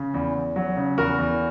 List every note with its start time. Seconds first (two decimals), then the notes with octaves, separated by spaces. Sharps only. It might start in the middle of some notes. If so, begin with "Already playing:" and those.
Already playing: C#3
0.14 E2
0.35 E2
0.56 F#3
0.77 C#3
0.98 E2 F#4 A#4
1.18 E2